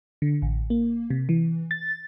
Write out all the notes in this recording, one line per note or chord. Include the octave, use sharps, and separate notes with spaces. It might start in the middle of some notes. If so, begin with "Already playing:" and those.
D3
A1
A#3
C3
E3
A6